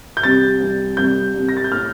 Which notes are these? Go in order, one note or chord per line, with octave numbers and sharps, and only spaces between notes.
G6
C2 C3 G3 A6
C2 C3 G3
C2 C3 G3 G6
C2 C3 G3
A#6
A6
G6
A2 A3 F6